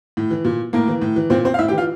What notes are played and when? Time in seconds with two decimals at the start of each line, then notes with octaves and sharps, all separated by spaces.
0.17 A2
0.30 E3
0.45 A#2
0.73 A2 A#3 A#4
0.88 E3
1.01 A2
1.16 E3
1.30 A#2 C4 C5
1.45 C4 C5
1.54 F5
1.59 A2 E4 E5
1.68 G4 G5
1.73 E3
1.78 F4 F5